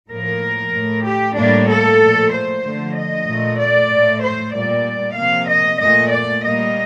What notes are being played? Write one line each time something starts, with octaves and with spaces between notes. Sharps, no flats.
A2 F3 A#3 A#4
A2 A3
G4
A2 G3 A#3 D4
A4
A#2 F3 A3
C5
D3 F3 A3
D#5
A#2 A3
D5
A2 A3
C5
A#2 G3 A#3 D5
C3 F3 A#3 F5
D#5
A#2 A3 D#5
D5
A#2 G3 A#3 D#5